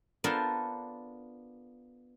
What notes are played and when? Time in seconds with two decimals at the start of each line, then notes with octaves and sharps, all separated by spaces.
0.24 B3 D4 F4 A4 A#4 C5